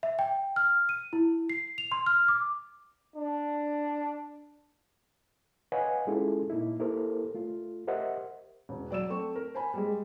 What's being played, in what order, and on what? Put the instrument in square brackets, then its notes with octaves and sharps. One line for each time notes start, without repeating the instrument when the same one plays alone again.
[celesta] E5
G5
F6
D#7
E4
C7
F7
C6
F6
D6
[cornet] D4
[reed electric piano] B4 C#5 D#5 F5 F#5 G#5
G#3 C#4 E4 F4 G#4 A4
A#2 A#3 D#4 E4
A#3 E4 G4 A4 A#4 C5
A3 F4
G4 A#4 C5 D#5 E5 F#5
[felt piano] E1
F#3 D5 E6 E7
A3 C4 C#6
A#4
C5 G#5 B5
G3 G#3